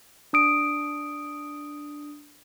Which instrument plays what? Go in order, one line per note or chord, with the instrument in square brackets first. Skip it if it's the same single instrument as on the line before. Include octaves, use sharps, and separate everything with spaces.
[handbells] D4 D#6 D7